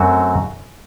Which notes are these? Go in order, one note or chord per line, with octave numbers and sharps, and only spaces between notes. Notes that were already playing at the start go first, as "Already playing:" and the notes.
Already playing: F#2 F#3 A3 C4 F#4